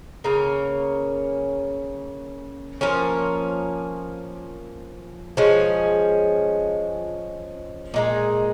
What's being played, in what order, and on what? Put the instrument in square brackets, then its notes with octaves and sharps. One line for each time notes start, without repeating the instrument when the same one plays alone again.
[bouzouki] C#3 A#3 C#4 A#4
F3 A#3 C#4 A#4
F3 G#3 C#4
A#2 G#3 D#4